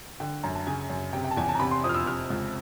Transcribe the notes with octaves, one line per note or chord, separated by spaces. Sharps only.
D3 G5
F#2 A#5
A5
C#3 G#5
F#2
C3 G5
G5
A5
E2 G#5
A5
A#5
C3 B5
C6
F2 D#6
F6
E6
C3 F6
C#2